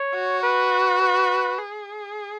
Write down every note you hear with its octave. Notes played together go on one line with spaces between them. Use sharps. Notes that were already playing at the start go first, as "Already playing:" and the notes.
Already playing: C#5
F#4
B4
B4
G#4